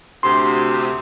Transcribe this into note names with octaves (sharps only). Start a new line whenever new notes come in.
D2 C3 C6